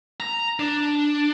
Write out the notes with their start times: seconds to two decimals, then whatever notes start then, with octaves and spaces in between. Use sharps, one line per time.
0.20 A#5
0.59 D4